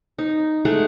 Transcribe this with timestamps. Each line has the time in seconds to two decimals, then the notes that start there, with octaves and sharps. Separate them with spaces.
0.18 D#4
0.65 G#3 A3 G#4 F#5